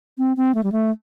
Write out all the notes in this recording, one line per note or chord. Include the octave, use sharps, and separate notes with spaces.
C4
C4
A3
G3
A3